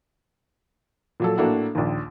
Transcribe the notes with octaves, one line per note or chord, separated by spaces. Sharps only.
A#2 F#3 A4
A2 A#3 D4 F#4 A4
A#1 D#2